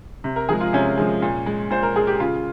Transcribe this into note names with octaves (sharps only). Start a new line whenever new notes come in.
C3
A#4
F3 G#3 G#4
F4
C3 C#4
F3 G#3
A#2
G#3
A#2 C5
A#4
G#3 G#4
G4
C#3 F4